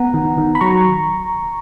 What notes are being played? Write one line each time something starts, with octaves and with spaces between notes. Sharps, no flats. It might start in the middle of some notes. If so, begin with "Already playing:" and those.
Already playing: B3 F#5 A#5
D#3
D#3
B5
F#3 A#5 C#6